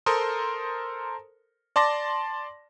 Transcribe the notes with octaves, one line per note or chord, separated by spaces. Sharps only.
A4 A#4 C5 C6 D#6
D5 A5 C6 D6 A#6